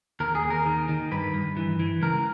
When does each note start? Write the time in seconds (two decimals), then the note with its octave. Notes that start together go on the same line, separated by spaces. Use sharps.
0.20 D#2 A#4
0.35 G#4
0.43 D#2
0.50 A#4
0.66 D#3
0.89 D#3
1.11 G2 B4
1.34 G2
1.57 E3
1.80 E3
2.02 C#2 A#4